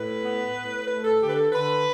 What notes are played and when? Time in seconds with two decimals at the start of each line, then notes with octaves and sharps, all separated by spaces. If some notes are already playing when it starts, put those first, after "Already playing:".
Already playing: A2 B4
0.23 B3
0.56 A2
0.88 A3 B4
1.05 A4
1.20 D3 G4
1.29 B4
1.36 A4
1.52 D3 B4